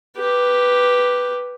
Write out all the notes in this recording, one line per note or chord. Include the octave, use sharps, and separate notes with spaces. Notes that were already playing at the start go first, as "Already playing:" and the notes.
G4 B4